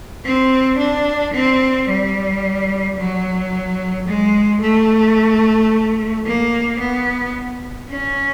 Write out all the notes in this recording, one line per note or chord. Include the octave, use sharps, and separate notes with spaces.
C4
D4
C4
G3
F#3
G#3
A3
A#3
B3
C#4